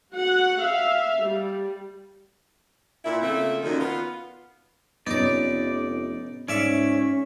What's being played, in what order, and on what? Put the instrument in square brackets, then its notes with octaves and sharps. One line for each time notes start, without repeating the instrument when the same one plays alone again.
[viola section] F#4 F#5
E5 F5
G3
[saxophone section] A#2 E4
C#3 F3 A3 A#3 C4 E5
F#2 A#2 D#3
B3 F4
[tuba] F1 [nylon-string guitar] B3 C#4 [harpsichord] D#4 D6 [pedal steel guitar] D5
[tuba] G#2 [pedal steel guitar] C#4 [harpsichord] D5 E5 C#6